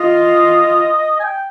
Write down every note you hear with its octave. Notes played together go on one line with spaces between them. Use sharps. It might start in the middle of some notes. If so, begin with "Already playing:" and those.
Already playing: F4 D#5
G#5
G5